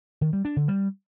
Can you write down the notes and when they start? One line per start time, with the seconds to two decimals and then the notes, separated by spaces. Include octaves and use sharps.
0.21 D#3
0.33 G3
0.45 D4
0.56 D3
0.68 G3